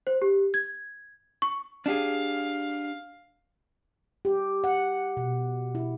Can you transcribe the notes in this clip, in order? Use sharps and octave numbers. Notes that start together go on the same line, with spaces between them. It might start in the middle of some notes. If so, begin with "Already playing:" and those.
C5
G4
G#6
C#6
D4 G4 G#4 F5
G4
F#5
B2
E4